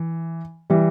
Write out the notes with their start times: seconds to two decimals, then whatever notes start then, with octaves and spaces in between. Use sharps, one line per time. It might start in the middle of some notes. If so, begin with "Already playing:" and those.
Already playing: E3
0.70 E3 G3